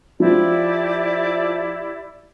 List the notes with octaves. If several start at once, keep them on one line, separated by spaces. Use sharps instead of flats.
F3 E4 G4 D5